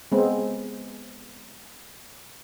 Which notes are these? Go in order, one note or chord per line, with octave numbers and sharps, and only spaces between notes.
G#3 B3 C4